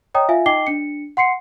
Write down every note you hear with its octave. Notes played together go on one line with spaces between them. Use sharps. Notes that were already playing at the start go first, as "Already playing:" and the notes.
C#5 D#5 G5 A#5 D#6
F4 E5 F5 G#5
D#4 D#5 G5 D6 C7 G7
D4 C#7
F#5 C6 C7 C#7